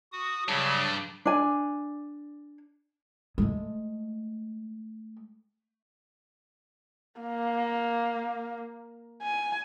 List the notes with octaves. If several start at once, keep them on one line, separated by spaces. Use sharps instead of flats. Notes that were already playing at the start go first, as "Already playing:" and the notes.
F#4 D#6
G2 C#3 F#3 D4
D4 G#5
G#3 A3
A#3
G#5